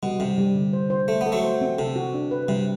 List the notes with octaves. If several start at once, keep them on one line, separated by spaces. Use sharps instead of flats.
B2 G3
C3 G3
G3
D3
C5
C5
A3 A4
B3
A4
F#3 A3
C5
C4
C3 A4
F#4
D4
B4
C3 G3